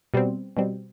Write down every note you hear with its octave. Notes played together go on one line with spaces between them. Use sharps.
B2 G3 C4
B2 G3 C4